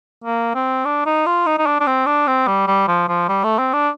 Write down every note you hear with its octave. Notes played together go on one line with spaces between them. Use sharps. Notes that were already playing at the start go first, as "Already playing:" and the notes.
A#3
C4
D4
D#4
F4
D#4
D#4
D4
D4
C4
D4
C4
G3
G3
F3
F3
G3
A3
C4
D4